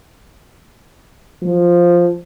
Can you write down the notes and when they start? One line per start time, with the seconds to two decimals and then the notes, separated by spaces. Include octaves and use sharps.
1.42 F3